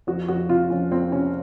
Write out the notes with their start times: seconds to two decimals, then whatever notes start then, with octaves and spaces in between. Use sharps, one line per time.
0.07 F2 F#4
0.28 F2 F#4
0.49 C3 F4
0.70 F2 C#4
0.91 F2 C4
1.12 C3 C#4